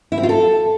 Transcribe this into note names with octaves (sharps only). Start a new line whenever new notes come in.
E4
C4
F4
A4